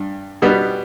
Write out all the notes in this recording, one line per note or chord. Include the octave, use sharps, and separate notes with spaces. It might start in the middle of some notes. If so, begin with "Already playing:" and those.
Already playing: G2
B2 G3 B3